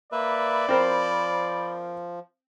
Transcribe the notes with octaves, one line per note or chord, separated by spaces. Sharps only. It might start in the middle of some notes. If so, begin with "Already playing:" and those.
A#3 B4 D5 E5 B5
F3 C4 A#4 C5